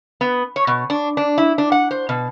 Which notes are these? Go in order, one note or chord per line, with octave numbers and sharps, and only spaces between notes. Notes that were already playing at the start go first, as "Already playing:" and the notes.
B3
C#5
B2
D4
D4
E4
D4
F#5
C5
B2